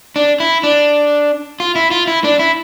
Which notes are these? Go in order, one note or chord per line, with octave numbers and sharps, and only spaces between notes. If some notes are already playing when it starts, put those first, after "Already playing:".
D4
E4
D4
F4
E4
F4
E4
D4
E4